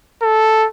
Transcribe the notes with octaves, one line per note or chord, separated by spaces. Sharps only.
A4